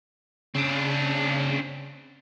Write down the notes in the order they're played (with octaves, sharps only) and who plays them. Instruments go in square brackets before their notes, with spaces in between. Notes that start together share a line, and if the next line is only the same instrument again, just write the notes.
[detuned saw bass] C#3 [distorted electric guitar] C4 D4